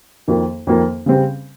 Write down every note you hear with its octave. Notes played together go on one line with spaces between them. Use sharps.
F2 D#3 A#3 F4
F2 D#3 A#3 F4
C#3 G3 C4